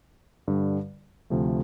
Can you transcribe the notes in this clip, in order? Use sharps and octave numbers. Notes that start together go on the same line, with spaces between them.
G2 D3 G3
D2 C3 F3 A3